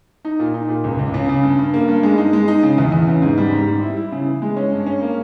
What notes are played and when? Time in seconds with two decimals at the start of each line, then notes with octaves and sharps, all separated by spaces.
0.25 D#4
0.39 A#2
0.54 D#4
0.69 A#2
0.84 C#2
0.99 C#2
1.14 C#3
1.29 C#3
1.43 G2
1.58 G2
1.74 A#3
1.88 G2
2.03 G#3
2.18 D#4
2.33 G#3
2.48 D#4
2.63 C#3
2.78 E2
2.92 E2
3.08 C#3
3.22 G#2
3.38 G3
3.52 G#2
3.68 G3
3.83 E4
3.97 E4
4.12 C#3
4.27 E3
4.42 G#3
4.57 C#4
4.72 G2
4.86 C#4
5.02 A#3